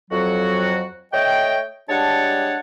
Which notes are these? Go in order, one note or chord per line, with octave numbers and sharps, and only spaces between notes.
F2 F#3 F#4
A3 C#5 D#5 G5
G3 G#3 D4 C#5 F#5 A5